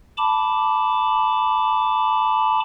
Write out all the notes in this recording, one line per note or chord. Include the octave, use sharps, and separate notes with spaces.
A5 B5 D6